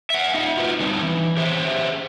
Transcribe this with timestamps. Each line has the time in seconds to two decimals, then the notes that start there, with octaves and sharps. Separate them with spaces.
0.10 E5 F#5
0.35 D#4 D#5 E5
0.57 F4 F#4 B4
0.81 G3 C4 D4 D#4
1.03 E3
1.37 G4 G#4 C5 E5